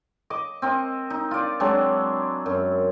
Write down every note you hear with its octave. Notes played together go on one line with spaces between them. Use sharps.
D#5 D6
C4 A#4 D#5
D#4
F4 D5
F#3 G#3 C4 D4
F#2